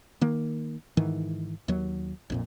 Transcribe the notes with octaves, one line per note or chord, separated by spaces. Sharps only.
D#3 A#3
G#2 D#3 E3
D#2 F#3
A#1 F2 A#2